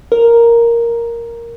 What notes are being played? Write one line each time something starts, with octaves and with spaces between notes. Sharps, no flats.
A#4